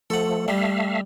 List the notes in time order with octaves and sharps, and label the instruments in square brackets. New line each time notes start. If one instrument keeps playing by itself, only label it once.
[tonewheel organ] F3 A3 [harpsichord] A4 F#5
[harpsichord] G3 [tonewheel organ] A3 E5 F5